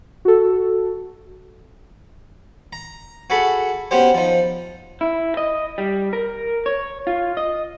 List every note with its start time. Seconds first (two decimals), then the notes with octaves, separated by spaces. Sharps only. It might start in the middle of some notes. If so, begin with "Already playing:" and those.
0.25 F#4 A4
2.73 A#5
3.30 F#4 G#4 A4 B5 C#6
3.91 B3 C#4 F#4 G4 C5
4.14 F3 D#4
5.01 E4
5.37 D#5
5.78 G3
6.13 A#4
6.66 C#5
7.07 F4
7.37 D#5